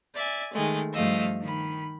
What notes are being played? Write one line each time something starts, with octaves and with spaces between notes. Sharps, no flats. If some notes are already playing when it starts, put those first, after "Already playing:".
D5 E5 G#5
D#3 G#3 A3
G2 F3 A3 D#5 F5 E6
D#3 B5